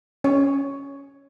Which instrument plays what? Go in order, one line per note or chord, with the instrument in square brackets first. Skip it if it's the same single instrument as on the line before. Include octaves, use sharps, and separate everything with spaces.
[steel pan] C#4 C#5